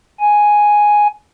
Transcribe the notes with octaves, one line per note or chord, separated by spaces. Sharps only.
G#5